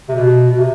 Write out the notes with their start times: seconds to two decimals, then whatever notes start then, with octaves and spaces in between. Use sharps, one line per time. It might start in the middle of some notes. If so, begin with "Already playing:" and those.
0.09 C3
0.16 B2
0.49 B2
0.59 C3